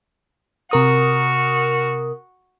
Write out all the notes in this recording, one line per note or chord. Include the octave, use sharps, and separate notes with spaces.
C3 F#4 A#4 D#6 F6